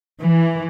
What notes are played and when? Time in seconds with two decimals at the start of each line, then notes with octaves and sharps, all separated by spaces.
0.21 E3